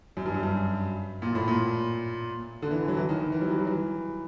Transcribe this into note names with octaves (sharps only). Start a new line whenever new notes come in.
F#2
G2
F#2
G2
A#2
A2
A#2
D3
E3
F#3
E3
D#3
D#3
E3
F#3
G3
F#3
E3